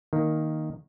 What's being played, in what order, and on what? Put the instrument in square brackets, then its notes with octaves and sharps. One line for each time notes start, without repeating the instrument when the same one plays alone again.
[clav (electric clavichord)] D#3 A#3